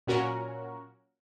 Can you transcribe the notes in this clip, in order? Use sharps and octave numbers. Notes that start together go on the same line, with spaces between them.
A#2 F#3 C#4 F#4 A#4